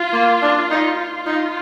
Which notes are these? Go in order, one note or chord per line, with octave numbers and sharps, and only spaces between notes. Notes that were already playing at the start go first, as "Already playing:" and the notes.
Already playing: F4
A#3
D4
D#4
F4
D#4